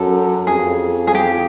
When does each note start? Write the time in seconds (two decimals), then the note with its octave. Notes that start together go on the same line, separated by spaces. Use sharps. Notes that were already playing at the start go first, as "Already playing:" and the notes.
Already playing: F#2 A4
0.47 F2 G#4
1.07 G#4
1.15 G4